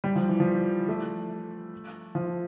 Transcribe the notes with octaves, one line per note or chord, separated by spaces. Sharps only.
G3
F3
E3
F3
A3
F3